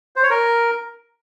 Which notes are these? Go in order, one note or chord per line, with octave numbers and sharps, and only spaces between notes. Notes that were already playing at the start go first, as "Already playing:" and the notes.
C5
C#5
A#4